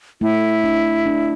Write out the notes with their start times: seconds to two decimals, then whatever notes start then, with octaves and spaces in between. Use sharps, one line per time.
0.21 A3 E4
0.64 D4
1.06 D4